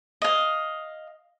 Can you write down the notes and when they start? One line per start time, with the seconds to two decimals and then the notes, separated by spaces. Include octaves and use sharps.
0.22 D#5 F5